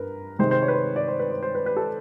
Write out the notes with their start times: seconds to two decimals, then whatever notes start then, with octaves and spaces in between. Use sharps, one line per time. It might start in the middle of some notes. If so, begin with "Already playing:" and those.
Already playing: G2 A#4 B4
0.39 C3 D#3 G#3 C5
0.51 C5
0.62 C#5
0.68 B4
0.74 C5
0.96 D5
1.08 C5
1.19 B4
1.31 C5
1.43 C5
1.55 B4
1.66 B4
1.77 A4